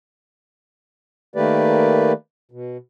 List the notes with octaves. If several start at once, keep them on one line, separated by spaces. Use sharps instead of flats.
D#3 A3 A#3 G4 B4 D5
B2